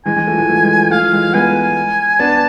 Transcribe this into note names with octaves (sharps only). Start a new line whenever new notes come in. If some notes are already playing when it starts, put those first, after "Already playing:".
E3 G#3 G#5
E3 G#3
F3 A3
E3 G#3
F3 A3
E3 G#3
F3
F3 A3 F5
F3
E3 G#3
G#3 B3 G#5
B3 D4 A5